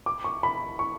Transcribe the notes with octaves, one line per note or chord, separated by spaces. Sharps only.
D6
C#6
B5
C#6